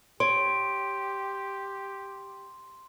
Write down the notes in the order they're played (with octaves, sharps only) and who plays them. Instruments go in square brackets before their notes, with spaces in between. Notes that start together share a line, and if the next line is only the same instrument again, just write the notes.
[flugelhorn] G4 [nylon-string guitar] C#5 [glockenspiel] C6 [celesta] D7